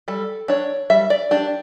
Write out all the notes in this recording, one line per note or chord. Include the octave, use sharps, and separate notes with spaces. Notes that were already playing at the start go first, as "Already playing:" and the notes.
G3 A4
D4 C#5
G3 E5
D5
D4 G4